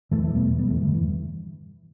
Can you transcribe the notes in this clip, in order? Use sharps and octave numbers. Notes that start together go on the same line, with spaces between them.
E2 E3 A3
E3 A3
B2
G3 B3
B2
G3 B3
E2
E3 A3
G2 D3 G3
E3